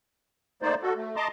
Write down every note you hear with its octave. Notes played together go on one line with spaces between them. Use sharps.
A3 A#3 D#4 C5 D5
F#4 A4
A3
D#5 A5 A#5 C6 D6